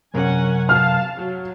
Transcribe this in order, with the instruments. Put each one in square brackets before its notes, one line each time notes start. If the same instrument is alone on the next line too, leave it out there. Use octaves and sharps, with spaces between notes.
[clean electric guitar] F#2 C3 A#4 [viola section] C#4 F#5 G#5
[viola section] F5 A5 [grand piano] F6
[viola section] F#3